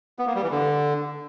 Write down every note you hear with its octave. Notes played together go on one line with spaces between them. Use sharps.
B3
A#3
G3
E3
D3